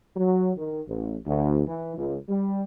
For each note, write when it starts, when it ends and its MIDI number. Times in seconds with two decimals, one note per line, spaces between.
0.16 0.52 54
0.57 0.81 51
0.87 1.17 33
1.26 1.62 38
1.66 1.95 52
1.96 2.16 37
2.29 2.62 55